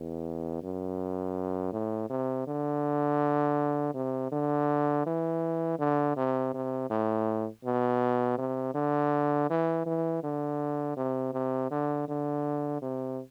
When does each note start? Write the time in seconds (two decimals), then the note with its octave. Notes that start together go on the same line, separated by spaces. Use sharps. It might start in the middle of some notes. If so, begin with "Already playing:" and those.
Already playing: E2
0.63 F#2
1.73 A2
2.09 C3
2.47 D3
3.94 C3
4.32 D3
5.06 E3
5.79 D3
6.17 C3
6.54 C3
6.90 A2
7.64 B2
8.38 C3
8.75 D3
9.50 E3
9.86 E3
10.23 D3
10.96 C3
11.33 C3
11.71 D3
12.08 D3
12.82 C3